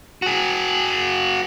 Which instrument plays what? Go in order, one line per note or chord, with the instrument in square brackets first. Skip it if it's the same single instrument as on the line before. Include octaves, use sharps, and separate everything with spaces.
[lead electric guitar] F#4 G#4